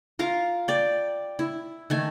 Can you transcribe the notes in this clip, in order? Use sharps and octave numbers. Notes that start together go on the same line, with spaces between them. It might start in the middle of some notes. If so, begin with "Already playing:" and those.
F4 A#4 F5 A#5
D5 G5
E4
D#3 A3 G#5